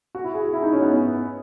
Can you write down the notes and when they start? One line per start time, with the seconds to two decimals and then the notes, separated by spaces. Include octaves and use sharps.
0.15 F#4
0.24 E4
0.34 G#4
0.43 F#4
0.53 E4
0.63 D#4
0.72 C#4
0.82 B3